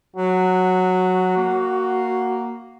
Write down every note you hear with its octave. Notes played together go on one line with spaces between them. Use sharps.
F#3 F#4
A#3